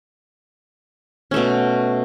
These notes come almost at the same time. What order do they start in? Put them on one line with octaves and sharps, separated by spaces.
C#4 A3 B2